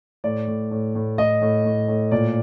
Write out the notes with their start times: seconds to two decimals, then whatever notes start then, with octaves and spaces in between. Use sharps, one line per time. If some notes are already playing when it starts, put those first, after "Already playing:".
0.24 A2 D5
0.47 A2
0.71 A2
0.95 A2
1.18 A2 D#5
1.42 A2
1.65 A2
1.88 A2
2.11 A#2 D5